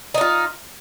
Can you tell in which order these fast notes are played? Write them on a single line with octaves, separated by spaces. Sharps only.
D#4 D4 F4